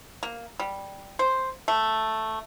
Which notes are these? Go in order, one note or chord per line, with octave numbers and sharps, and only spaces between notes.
A#3
G3
C5
A3